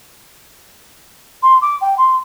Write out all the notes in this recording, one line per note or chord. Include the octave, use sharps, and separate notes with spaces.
C6
D6
G5
C6